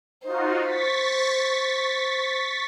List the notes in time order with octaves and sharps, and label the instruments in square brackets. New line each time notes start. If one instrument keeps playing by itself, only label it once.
[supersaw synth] D#4 F4 F#4 [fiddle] C5
[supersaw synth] C#6 A6 B6